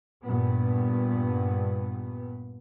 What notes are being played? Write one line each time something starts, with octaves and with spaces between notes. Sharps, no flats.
G2 A#2 B3